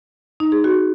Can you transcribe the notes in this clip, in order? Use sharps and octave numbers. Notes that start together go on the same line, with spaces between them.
D#4
G#4
F#4